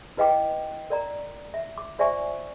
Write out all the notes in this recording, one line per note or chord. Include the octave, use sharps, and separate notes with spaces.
E4 B4 D#5 F5 G5 D6
A#4 D5 A#5
E5
D6
F4 C5 D5 E5 G#5 C#6